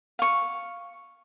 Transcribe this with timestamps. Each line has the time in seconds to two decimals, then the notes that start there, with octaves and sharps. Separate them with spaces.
0.19 F5 C#6